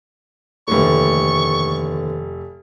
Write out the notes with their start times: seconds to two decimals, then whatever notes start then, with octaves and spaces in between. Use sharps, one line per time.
0.68 F1 D#2 D3 E3 A3 C#6